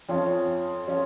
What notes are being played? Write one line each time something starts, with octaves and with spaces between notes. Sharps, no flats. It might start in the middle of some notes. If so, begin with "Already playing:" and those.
F2 F3 C#4 F4
F3 C#4 F4